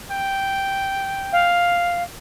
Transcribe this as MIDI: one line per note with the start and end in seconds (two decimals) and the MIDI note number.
0.12 1.49 79
1.32 2.03 77